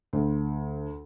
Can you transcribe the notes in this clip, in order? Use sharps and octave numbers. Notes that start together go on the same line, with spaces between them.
D2